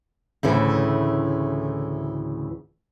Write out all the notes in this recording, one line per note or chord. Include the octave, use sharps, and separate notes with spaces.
D2 A2 C#3 E3